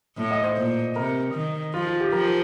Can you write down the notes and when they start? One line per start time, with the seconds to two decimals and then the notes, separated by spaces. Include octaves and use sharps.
0.18 A2
0.31 D#5
0.44 C5
0.57 A#2
0.96 C3 A#4
1.34 D#3
1.74 F3 F4
1.87 F4
2.00 G4
2.12 F3 A#4